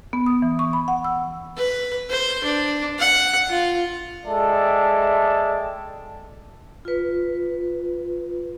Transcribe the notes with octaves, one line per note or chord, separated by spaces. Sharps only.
B3
D#6
E3
C#6
B5
F#5
E6
B4
C5
D4
F#5
F4
G#3 A4 D5 E5 G5 A5
F4 B4